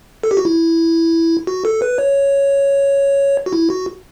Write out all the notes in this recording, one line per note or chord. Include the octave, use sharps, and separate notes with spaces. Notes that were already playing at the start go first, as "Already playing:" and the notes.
A4
G4
F#4
E4
F#4
A4
B4
C#5
F#4
E4
F#4